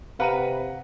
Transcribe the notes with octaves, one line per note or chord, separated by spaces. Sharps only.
C3 B4 F5 F#5 A#5 D#7